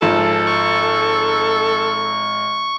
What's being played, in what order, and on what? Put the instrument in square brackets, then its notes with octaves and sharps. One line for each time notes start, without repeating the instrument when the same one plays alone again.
[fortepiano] G#1 F3 [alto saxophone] A4
[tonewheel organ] C#6